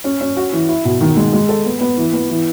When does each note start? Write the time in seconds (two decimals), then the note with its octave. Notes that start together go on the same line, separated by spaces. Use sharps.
0.04 C#4
0.21 C#4
0.37 F#4
0.53 E3
0.69 E4
0.85 B2
1.01 D#3
1.17 G#3
1.33 G#3
1.49 A4
1.66 B3
1.81 B3
1.97 E3
2.13 B3
2.30 E3